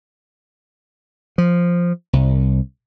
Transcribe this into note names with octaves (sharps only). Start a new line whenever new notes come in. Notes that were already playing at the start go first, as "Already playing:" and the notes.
F3
C2